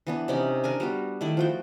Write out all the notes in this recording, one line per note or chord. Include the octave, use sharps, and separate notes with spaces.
E3 B3 D4
C3 C#4 D#4 D5
D4 A#4 G#5
G3 B3 F#4
D#3 A3 E4 D5
F3 F#4 G5